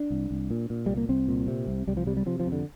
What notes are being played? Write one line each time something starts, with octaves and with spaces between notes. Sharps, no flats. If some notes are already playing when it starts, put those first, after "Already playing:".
Already playing: D4
C2
C2
A#2
A#2
C2 G3
A#3
C2 C4
A#2
C3
C2
C2 G3
F3
C3 G3
G3
C3 F3
F3
F2
D3